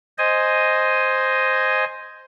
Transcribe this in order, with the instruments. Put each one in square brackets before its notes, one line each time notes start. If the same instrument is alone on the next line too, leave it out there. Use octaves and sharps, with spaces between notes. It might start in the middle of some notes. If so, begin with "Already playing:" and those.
[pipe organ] C5 D#5 G#5